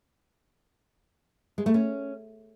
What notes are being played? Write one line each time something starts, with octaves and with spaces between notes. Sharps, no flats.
G#3
A3
C#4